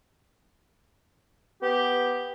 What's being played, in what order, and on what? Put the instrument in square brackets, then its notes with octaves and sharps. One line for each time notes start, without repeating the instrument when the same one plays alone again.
[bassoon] B3 [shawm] G4